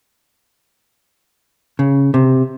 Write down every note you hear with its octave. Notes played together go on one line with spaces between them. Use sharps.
C#3
C3